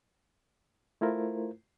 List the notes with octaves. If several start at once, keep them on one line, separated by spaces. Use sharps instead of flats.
A3 E4 F4 A#4 C5